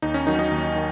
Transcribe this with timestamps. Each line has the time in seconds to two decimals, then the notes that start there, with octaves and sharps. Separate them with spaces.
0.02 D#2 D#4
0.14 C#4
0.27 D#3 F#3 D#4
0.39 D#4
0.52 D#2
0.76 D#3